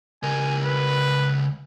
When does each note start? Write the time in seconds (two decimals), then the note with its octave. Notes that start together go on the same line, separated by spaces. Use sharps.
0.23 C#2 A#4 G#5
0.65 B4